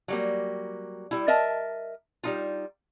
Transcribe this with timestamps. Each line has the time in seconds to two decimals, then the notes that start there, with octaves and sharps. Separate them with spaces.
0.08 F#3 G3 A#3
1.11 G3 E4
1.28 A#4 D#5 E5 A5
2.23 G3 D#4 F4